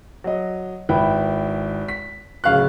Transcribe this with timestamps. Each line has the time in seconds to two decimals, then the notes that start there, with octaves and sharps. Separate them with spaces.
0.24 F#3 D#5
0.89 G#1 E4 B4 G5
1.88 B6
2.44 D1 C#3 F5 C#6 F#6